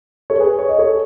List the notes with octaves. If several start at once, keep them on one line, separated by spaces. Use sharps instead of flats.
A4 C#5
G#4 B4
C#5
D#5
A4 C#5